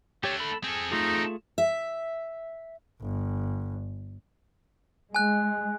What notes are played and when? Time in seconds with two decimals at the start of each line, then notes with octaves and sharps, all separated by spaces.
0.24 A3 D4 G4 C#5
0.40 A4 B5
0.64 C4 G#4 A4
0.92 A3 D#4 F4 G#4
1.58 E5
3.01 G1
5.15 G#3 G#5 F#6